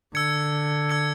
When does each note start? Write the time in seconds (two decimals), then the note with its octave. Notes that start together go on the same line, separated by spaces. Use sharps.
0.14 D3 E6 G#6 C#7
0.89 E6 G#6 C#7